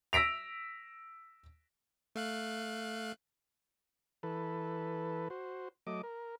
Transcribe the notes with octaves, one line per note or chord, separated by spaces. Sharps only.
E6 A#6 B6 D7 F7
A3 F5 F#6
E3 A4 B4
F#4 C5
F#3 A3 D#5 D6
A#4